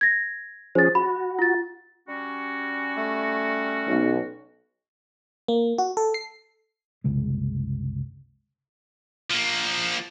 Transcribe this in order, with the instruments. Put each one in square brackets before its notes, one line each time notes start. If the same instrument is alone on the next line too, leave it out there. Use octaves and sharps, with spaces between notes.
[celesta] G#6 A#6
[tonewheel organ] F3 C#4 G#4 [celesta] C5 A6
[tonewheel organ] F#4 [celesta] B5
[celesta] F4 A6
[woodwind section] G3 C#4 F#4
[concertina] A3
[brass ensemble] B1
[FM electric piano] A#3
F#4
A4
C7
[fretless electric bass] F#1 C2 C#3 G#3
[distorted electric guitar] F3 A#3